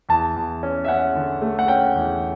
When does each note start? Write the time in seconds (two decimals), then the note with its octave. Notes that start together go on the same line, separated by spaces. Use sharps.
0.09 E2 A5
0.36 E2
0.63 C#4
0.85 E5
0.88 C#4 F#5
1.15 D3
1.42 A3
1.59 F#5
1.68 C#4 G5
1.96 E2